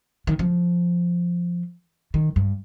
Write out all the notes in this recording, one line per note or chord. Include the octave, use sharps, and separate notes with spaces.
D#3
F3
D#3
G2